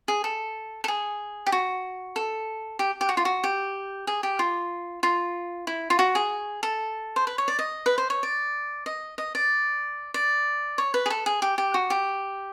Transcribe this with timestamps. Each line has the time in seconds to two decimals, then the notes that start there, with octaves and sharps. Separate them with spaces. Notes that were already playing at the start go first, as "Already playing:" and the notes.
0.08 G#4
0.24 A4
0.84 A4
0.88 G#4
1.47 G4
1.52 F#4
2.16 A4
2.79 G4
3.01 G4
3.09 F#4
3.17 F4
3.25 F#4
3.44 G4
4.07 G#4
4.23 G4
4.39 F4
5.03 F4
5.67 E4
5.90 F4
5.99 F#4
6.15 G#4
6.63 A4
7.16 C5
7.27 B4
7.38 C#5
7.48 D5
7.59 D#5
7.86 B4
7.98 C5
8.10 C#5
8.23 D5
8.86 D#5
9.18 D#5
9.35 D5
10.14 D5
10.78 C#5
10.94 B4
11.06 G#4
11.10 A4
11.26 G#4
11.42 G4
11.58 G4
11.74 F#4
11.90 G4